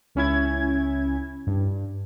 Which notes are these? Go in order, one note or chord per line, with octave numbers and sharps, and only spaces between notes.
C#2 C#4 E4 G#6
G2